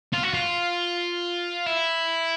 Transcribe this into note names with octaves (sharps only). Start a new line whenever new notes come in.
F4
F#4
F4
E4